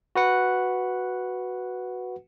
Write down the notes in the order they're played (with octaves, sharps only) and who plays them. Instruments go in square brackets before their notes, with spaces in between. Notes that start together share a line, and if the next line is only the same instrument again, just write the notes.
[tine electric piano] F#4 B4 F#5